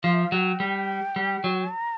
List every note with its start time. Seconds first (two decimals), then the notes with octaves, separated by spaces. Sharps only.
0.04 F3 F5
0.14 E5
0.23 F5
0.32 F#3 G5
0.60 G3
1.16 G3
1.44 F#3
1.72 A#5